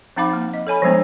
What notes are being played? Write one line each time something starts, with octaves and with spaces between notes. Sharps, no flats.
F3 C4 D#4 F5 B5 D6
A#3
D#5
A4 C#5 G#5 B5
F3 G3 G#3 B3 D4